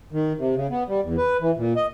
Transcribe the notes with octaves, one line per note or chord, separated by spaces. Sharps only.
D#3
C3
C#3
B3
G3
E2
B4
E3
A#2
D#5